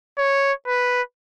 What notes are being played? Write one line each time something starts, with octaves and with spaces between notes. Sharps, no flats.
C#5
B4